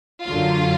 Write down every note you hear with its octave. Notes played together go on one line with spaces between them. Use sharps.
F#2 D3 F#3 F4